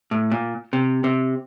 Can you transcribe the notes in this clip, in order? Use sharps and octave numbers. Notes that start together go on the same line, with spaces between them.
A2
A#2
C3
C3